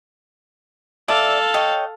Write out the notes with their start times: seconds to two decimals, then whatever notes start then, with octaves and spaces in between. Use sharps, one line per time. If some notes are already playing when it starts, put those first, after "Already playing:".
1.08 A4 D5 E5 F5 A5
1.54 C#5 D#5 G5